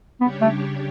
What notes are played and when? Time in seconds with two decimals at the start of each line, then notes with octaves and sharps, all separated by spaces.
0.21 C#3 G3 B3 D4 G4 C#5
0.41 A3